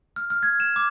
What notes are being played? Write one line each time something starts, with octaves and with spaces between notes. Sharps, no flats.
F6
F6
G#6
E7
D6